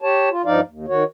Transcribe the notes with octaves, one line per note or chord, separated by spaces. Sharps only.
G4 C#5 A5
F4
G2 F3 D#4 D5 F5
D#2
D#3 F#4 C#5